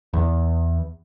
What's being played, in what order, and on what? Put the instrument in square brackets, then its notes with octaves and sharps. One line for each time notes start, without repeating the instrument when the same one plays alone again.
[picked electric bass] E2